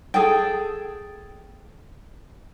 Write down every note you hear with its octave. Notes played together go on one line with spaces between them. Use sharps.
G#4 A4 G5